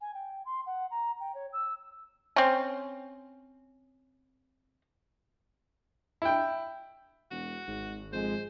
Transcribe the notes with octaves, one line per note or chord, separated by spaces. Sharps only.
G#5
G5
C6
F#5
A#5
G5
C#5
E6
C4 C#4
E4 G5
E1 F#4
G#1 G#2
F2 G#3 C5